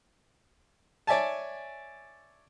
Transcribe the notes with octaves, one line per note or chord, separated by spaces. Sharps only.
C#5 D5 E5 G#5 A5